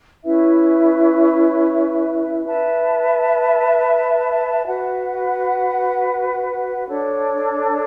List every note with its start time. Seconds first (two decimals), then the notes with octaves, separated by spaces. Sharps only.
0.23 C#4 E4 B4 E5
2.44 B4 E5 A5
4.66 F#4 B4 F#5
6.88 D4 A4 C#5